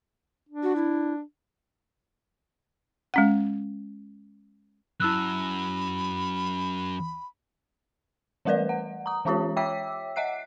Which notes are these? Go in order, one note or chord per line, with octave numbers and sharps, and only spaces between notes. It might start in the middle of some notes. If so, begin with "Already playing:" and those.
D4
F#4
E4
G#3 C#4 F#5
F#2 E4 B5 E6 F#6
E3 G3 A3 A#4 B4 D5
F#5
A#5 D#6
E3 G#3 C#4 F4 G4 C#5
C#5 E5 G5 D6 E6 B6
D#5 E5 F#5 F#6 C7